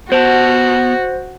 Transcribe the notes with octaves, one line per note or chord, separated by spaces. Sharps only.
B3 F#4 C5 F#5 A5